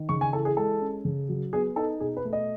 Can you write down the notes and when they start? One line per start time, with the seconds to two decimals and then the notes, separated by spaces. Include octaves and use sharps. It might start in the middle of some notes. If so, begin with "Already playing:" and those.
Already playing: D#3
0.09 C#3 C#6
0.21 G#5
0.33 E3 A4
0.45 G#4
0.57 G#3 A4
0.81 C#4
1.05 C#3
1.29 F#3
1.53 B3 G#4
1.76 D#4 A4
2.00 B2 G#4
2.17 B4
2.25 A3
2.33 D#5